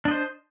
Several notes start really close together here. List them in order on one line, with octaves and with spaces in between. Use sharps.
D4 D#5 C5